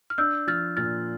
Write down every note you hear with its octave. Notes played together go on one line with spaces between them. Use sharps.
F6
D4 E6 G6
F3 F6 A6
A#2 F6 A6